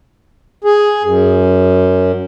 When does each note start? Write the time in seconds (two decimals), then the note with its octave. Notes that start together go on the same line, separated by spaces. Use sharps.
0.64 G#4
1.03 F#2